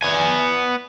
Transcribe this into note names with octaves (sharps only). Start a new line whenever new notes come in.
B3 G#5